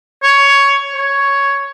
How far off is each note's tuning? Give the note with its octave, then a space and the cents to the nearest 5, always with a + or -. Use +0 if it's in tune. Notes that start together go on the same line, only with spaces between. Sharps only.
C#5 +10
C#5 +5